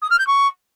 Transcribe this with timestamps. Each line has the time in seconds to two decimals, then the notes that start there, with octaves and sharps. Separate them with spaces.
0.02 D#6
0.11 F6
0.19 G6
0.27 C#6